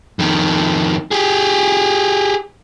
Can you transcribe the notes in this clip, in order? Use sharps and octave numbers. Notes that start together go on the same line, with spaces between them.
F2 D#3
G4 G#4